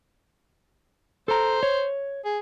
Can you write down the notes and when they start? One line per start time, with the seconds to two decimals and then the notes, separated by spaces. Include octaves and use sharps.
1.28 A4 C5 A#5
1.63 C#5
2.25 G#4